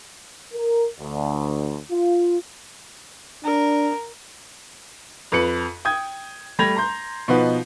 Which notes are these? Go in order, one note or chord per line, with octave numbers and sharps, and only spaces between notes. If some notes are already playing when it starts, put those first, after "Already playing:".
A#4
D2
F4
D4 A#4
F2 B4 C#7 F#7
G5 D#6 G#6
G3 A3 B5 G#6 A#6 F7
A#5 C6 G6
B2 F3 D#4 B4 F#5